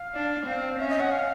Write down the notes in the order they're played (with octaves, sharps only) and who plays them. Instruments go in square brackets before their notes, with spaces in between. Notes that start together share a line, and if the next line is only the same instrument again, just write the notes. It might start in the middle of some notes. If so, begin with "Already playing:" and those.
Already playing: [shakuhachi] F5
[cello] D4
C4
[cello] C#4 [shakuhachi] E5
[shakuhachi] D#5
F#5
F5